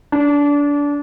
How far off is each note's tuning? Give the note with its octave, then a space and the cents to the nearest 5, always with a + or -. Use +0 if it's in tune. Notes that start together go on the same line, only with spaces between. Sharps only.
D4 -25